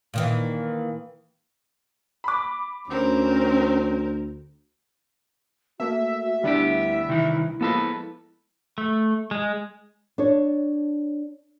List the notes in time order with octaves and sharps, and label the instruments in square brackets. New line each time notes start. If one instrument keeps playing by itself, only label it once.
[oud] A#2 D#3 E3
[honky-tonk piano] B5 D6
[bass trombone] D2 [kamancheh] C4 A#4 [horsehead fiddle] C#4
[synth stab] A3 A#3 [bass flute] F#4 [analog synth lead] E5
[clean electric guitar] D2 B3 G4 [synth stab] G3 D4 [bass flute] E4
[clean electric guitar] C2 D#3 E3
[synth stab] F3 G#3 A#3 [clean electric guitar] B3 A4 B4
[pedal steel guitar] A3
G#3
[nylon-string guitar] D4 C#5